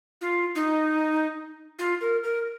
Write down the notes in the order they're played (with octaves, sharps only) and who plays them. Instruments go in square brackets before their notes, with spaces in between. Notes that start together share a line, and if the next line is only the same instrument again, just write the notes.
[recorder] F4
D#4
F4
A#4
A#4